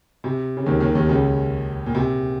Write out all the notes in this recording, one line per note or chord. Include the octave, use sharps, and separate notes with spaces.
C3
C#3
D#2 D#3
D#2 D#3
D#2 D#3
C#2 C#3
A#2
C3